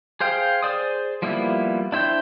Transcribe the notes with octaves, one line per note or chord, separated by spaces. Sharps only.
G#4 C5 F5 G5
G#4 C5 D5 D#6
F3 G3 A#3 B3 E4
D4 E4 C5 G5